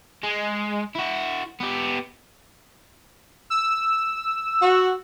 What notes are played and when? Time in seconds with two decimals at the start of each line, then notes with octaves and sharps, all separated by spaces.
0.24 G#3
0.96 E4 F#4
1.61 B3 G4
3.50 E6
4.62 F#4